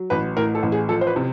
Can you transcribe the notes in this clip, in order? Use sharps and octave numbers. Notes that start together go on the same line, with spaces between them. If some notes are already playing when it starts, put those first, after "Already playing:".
Already playing: F#3
A1 B4
A2 A#4
A4
A1
G#4
F3 A4
C5
B4
C3